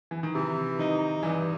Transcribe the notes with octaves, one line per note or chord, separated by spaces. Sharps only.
E3
D#3
C3 E3
D#3 D#4
G2 E3